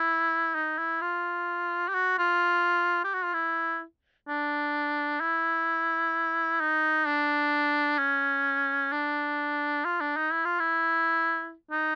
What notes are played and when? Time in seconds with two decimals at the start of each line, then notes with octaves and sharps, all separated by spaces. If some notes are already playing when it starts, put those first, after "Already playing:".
Already playing: E4
0.55 D#4
0.78 E4
1.01 F4
1.89 G4
1.94 F#4
2.18 F4
3.04 G4
3.14 F#4
3.24 F4
3.34 E4
4.27 D4
5.21 E4
6.60 D#4
7.06 D4
7.98 C#4
8.92 D4
9.85 F4
10.01 D4
10.17 D#4
10.31 E4
10.45 F4
10.60 E4
11.71 D#4